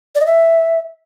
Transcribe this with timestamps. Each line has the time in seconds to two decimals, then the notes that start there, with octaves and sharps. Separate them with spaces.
0.15 D5
0.21 D#5
0.26 E5